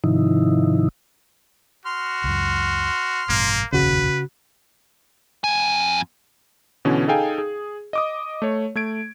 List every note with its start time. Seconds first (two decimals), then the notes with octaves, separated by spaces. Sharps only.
0.04 G#2 C3 D#3 F3 D#4 E4
1.85 F#4 C6 F6
2.24 C#2 F#2
3.29 A1 G2 B2 A#3
3.73 F1 A#1 D#2 C#3 F#4 B4
5.44 F2 G#5
6.85 B2 D3 E3 C#4
7.08 D#4 G#4 A4 F5 G5 G#5
7.38 G#4
7.93 D#5 D6 D#6
8.42 A3 C#5
8.75 A3 G#6 D7